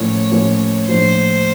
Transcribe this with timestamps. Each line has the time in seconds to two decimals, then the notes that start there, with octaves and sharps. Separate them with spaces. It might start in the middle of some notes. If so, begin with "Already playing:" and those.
Already playing: A2 F3 A#3 C#4 C#5
0.32 A2 F3 A#3 C#4
0.88 A#1 A2 F3 C5